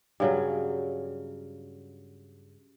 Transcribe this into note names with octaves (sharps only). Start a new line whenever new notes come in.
G2 C#3 F#3